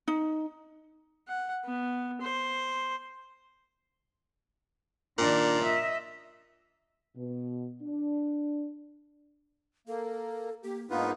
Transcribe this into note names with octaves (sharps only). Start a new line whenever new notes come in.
D#4
F#5
B3
C5
A#2 D#3 D4
D#5 E5
B2
D4
A#3 A4
A#3 G4
G#2 A#3 B3 D4 D#4 F4 B4